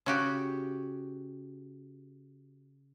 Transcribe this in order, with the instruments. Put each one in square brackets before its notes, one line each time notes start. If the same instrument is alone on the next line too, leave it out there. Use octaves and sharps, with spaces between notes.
[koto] C#3 F#4 G4